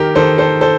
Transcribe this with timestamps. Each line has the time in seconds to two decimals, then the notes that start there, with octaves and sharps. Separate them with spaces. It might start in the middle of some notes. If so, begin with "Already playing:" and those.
Already playing: D#3 G4 A#4
0.15 D#3 A4 C5
0.38 A4 C5
0.61 A4 C5